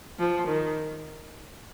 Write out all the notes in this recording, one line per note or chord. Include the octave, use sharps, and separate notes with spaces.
F3
D#3